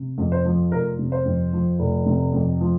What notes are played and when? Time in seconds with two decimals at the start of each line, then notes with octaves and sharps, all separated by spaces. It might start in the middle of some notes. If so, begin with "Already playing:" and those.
Already playing: C3
0.18 F2
0.32 C5
0.45 F3
0.72 F1 A#4
0.99 C3
1.12 C5
1.25 F2
1.53 F3
1.79 F1
2.06 C3
2.33 F2
2.61 F3